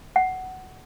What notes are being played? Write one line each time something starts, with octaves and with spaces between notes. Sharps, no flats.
F#5